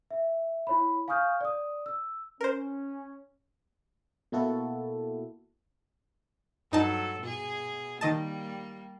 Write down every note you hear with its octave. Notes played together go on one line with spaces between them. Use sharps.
E5
E4 C#5 B5
F5 G#5 C#6 D#6 F6 G6
D5 D#6
E6
C#4 A#4 C5
B2 A#3 E4 F#4 A4
G2 F#3 D#4 A4 A5
B2 G#4
D#3 G3 A#3 D#5 A5